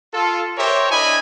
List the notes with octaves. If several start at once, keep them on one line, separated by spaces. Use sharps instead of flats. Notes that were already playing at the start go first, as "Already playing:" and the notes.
F4 A4
G4 A#4 C5 C#5 E5
D4 E4 D#5 G#5 B5